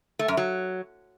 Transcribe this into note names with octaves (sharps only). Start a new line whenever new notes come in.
A3
F#2
F#3